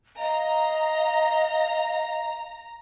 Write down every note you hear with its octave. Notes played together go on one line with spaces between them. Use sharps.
D#5 F5 A#5